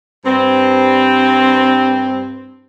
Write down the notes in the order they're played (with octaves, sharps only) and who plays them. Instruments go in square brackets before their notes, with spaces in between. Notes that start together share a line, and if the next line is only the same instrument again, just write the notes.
[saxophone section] G2 C4